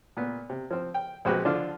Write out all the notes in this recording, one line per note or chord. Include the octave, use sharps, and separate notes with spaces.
A#2 B3
C3
F3 C4
G5
A#1 G#3 C4 F#4 G4 B4
D3 F3 D4 F4